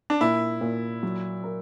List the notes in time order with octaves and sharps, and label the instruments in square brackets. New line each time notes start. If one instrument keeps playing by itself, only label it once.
[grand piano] D4
[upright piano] A#2 [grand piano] E4
[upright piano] A#2
F#3
A#4